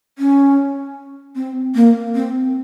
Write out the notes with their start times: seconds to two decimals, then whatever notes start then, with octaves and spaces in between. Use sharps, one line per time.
0.18 C#4
1.36 C4
1.75 A#3
2.15 C4